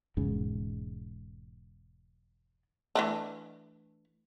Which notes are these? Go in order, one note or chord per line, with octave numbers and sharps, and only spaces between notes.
E1 G#2 C#3
E3 A3 D4